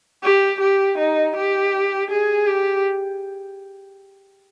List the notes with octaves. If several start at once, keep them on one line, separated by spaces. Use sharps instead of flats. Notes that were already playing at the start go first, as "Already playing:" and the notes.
G4
G4
D#4
G4
G#4
G4